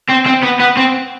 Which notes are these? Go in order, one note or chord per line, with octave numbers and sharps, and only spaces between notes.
C4
C4
B3
B3
C4